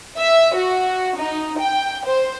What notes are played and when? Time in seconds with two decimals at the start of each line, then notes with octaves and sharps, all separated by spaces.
0.19 E5
0.56 F#4
1.17 D#4
1.59 G5
2.06 C5